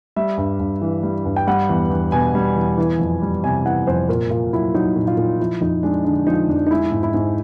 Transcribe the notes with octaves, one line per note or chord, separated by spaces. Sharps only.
G3 E5
G2
G2
E3
G3
G2
G5
G3 F#5
E2
E2
B2 G#5
G3
E2
E3
F2
G3
C3 G#5
E3 F#5
F2 C5
A#2 A#4
A#2 F4
F#3 E4
F#3 D#4
A#2
F4
A#2
F3 E4
F2 D#4
G#3 D4
D3 D4
F3 D#4
F2 D4
D#4
G#3 E4
G#2
E4
G#2